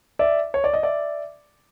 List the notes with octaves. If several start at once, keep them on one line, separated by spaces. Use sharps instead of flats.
D5 E5
C#5
D5
D#5
D5 E5